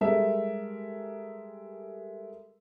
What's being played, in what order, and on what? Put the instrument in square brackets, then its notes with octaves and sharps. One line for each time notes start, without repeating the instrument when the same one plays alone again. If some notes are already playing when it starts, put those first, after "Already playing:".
[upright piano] G3 G#3 A4 A#4 E5